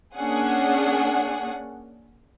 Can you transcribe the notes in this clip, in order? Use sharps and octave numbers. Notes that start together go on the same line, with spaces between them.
A#3 C#4 D4 G#4 F#5